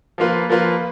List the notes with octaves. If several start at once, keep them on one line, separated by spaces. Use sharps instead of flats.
F3 A#3 F4 B4
F3 A#3 F4 B4